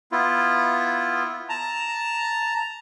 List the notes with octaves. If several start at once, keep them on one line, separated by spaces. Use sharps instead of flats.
B3 E4 F4
A5 A#5